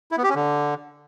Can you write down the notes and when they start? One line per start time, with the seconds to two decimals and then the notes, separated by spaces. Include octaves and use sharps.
0.12 E4
0.18 B3
0.24 G4
0.29 C#4
0.35 D3